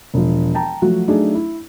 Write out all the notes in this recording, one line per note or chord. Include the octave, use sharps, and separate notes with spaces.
E1 F3
G5 A5 A#5
F3 F#3 A3 F#4
F#3 A3 D4 D#4 G#4
E4